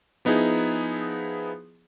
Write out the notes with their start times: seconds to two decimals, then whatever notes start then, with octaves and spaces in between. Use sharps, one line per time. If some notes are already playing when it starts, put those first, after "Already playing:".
0.25 F3 B3 D#4 E4 G#4